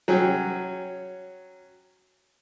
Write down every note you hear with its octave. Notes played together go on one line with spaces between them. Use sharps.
F#3 C#4 G#4 G5